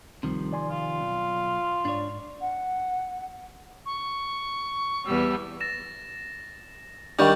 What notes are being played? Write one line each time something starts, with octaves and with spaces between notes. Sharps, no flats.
C#2 C3 D#3 F3 G3 C4
D5 G#5 C6
F4
B1
G#2 D4 C#5 D5
F#5
C#6
E2 G3 E6
A6 A#6 E7
D#3 G3 D4 G5 C#6 G6 F#7